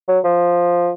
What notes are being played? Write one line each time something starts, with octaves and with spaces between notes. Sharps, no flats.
F#3
F3